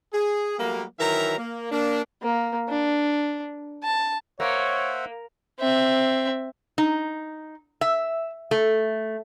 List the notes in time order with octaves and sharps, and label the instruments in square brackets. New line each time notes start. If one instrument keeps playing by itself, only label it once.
[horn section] G#4
F#3 G3 A3 A#3
D#3 E3 F#3 A#4 E5 A#5
A#3
A#3 D4
[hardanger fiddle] A#3
D4
A5
[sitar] A#3 [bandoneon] C5 E5 F#5 [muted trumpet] C#5
[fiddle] C4 E5
[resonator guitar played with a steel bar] D#4
E5
A3